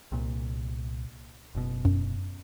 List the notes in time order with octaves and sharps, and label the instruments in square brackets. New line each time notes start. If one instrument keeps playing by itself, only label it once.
[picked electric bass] C2 A#2
F#1 B2
[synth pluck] F#2